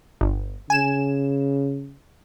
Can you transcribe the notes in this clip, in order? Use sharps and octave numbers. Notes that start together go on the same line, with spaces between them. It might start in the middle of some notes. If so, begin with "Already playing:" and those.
G1
C#3 G#5 E7